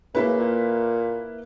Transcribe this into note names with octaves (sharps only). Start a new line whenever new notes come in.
C#3 A#3 E4 B4
A#2